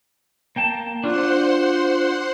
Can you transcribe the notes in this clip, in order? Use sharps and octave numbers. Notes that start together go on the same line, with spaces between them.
A#3 G5 A5
D4 F4 F#4 C5 F#5 C6